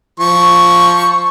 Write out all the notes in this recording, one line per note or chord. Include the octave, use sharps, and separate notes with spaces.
F3 C#6